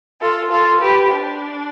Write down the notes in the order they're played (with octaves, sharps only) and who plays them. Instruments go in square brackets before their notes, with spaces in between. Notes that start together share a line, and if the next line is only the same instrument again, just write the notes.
[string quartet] F4 A4
F4 A4
G4 B4
D4